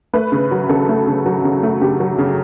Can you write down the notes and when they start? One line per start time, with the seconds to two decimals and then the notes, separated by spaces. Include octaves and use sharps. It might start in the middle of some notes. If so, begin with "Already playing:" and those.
0.13 A3 B4
0.32 C#3
0.51 F#3
0.69 C#3 A4
0.89 A3
1.07 C#3
1.26 F#3
1.44 C#3
1.63 A3
1.81 C#3 G4
2.00 F#3
2.19 C#3